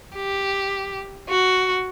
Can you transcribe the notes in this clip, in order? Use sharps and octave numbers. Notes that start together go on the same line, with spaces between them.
G4
F#4